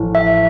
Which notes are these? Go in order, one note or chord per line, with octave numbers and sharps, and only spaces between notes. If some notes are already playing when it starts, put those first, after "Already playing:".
Already playing: A1 A2 F3
E5